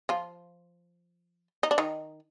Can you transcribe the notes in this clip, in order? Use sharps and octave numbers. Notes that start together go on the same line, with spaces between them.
F3 F4
D#4
D4
D#3 D#4